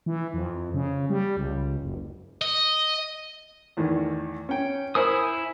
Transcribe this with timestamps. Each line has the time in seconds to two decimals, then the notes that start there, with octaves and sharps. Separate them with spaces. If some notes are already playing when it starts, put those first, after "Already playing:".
0.06 E3
0.34 F2
0.74 C#3
1.10 G3
1.37 C#2
1.81 F#1
2.41 D#5
3.77 E2 A2 D#3
4.49 C#4 G5
4.95 E4 A#4 C5 G#5 D#6 E6